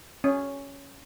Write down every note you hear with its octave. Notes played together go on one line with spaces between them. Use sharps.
C#4